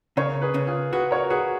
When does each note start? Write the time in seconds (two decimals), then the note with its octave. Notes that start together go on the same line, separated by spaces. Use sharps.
0.17 C#3 A#4 C#5
0.42 G#4 B4
0.54 C#3
0.67 F4 G#4
0.92 F#4 G#4 B4
1.11 A#4 C#5
1.30 F#4 G#4 B4